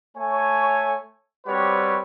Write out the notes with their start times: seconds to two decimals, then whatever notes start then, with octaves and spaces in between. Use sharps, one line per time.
0.17 A3 C#5 G#5
1.47 G3 C4 F#4 G4 B4 C#5